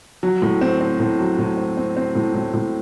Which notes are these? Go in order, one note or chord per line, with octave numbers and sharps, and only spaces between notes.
F#3
A2
C4
C4
A2
F#3
A2
C4
C4
C4
A2
A2
A2